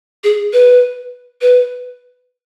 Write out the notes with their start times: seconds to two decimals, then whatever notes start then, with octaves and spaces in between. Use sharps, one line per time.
0.24 G#4
0.53 B4
1.41 B4